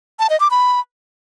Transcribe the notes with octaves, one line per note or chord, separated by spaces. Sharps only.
A5
D#5
D6
B5